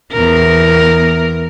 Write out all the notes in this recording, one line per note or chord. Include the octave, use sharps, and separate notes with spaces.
E2 A#4